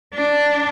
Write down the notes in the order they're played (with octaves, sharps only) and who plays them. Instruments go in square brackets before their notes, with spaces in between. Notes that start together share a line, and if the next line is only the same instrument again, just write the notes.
[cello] D4